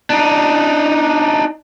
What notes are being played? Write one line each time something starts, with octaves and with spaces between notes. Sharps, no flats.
D4 D#4